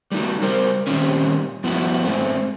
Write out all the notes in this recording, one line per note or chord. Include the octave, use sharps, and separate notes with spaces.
G3 A3 B3 D#4 F#4
G3 A#4 C5
A#2 D#3 G3 C4 C#4
G2 F3 B3 E4 F#4
G#2 A3 C4